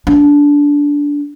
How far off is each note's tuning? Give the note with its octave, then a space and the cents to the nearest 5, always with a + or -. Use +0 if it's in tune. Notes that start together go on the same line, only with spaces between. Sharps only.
D4 -15